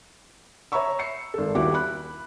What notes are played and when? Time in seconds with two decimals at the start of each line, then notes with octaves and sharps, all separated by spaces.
0.72 C#5 E5 A#5 B5 C#6 E6
0.99 C7 C#7
1.34 G#1 A4
1.55 D#1 D#2 E4 F#4 G4 D6
1.74 B5 F#6